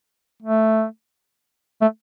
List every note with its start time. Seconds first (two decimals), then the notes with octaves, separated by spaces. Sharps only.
0.43 A3
1.82 A3